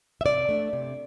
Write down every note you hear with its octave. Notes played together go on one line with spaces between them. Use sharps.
E5
C3 D5
A3 D4
C3